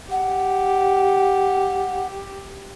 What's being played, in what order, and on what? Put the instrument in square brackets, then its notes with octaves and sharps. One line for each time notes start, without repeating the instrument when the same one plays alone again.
[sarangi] G4 [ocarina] F#5